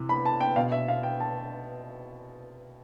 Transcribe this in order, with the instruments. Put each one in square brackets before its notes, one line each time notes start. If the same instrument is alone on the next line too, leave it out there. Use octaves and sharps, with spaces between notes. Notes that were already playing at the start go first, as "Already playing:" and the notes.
Already playing: [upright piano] C3 E3
B5
A5
G5
B2 F5
E5
F5
G5
A5